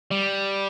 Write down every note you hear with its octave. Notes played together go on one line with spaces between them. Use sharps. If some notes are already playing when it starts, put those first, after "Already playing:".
G3